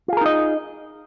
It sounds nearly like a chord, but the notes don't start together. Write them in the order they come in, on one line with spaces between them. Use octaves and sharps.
F4 G#4 A#4 D#4 D#5